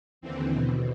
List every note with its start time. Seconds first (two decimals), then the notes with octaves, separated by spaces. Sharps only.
0.21 D#2 D3 E3 C4
0.53 B2